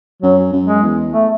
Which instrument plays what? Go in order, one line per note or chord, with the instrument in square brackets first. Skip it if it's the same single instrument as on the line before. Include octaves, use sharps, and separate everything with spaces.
[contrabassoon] F#2 [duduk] F#3
[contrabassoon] F#2
[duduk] G#3
[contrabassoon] E2
[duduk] A3